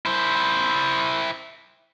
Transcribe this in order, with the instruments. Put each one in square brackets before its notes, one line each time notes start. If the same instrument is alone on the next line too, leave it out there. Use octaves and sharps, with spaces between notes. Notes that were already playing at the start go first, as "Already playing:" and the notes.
[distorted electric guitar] E4 C5